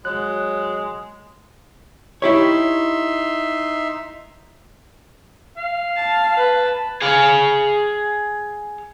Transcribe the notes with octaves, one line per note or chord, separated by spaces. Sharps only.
F#3 G#3 F#6
D#4 E4 G4 C#5 E5 C6
F5
A5
B4
G#4 F5